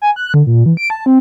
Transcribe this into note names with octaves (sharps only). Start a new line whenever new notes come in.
G#5
F#6
D3
A#2
E3
D7
A5
C4